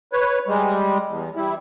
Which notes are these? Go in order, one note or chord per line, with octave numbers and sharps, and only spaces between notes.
B4 C#5
G3 G#3
E2
G3 E4